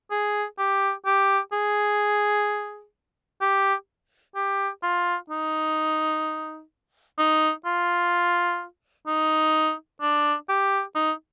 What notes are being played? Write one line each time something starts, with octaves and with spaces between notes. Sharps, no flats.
G#4
G4
G4
G#4
G4
G4
F4
D#4
D#4
F4
D#4
D4
G4
D#4